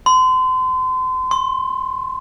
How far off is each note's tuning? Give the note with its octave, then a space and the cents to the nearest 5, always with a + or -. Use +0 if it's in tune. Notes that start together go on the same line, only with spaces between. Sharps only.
C6 -35
C6 +30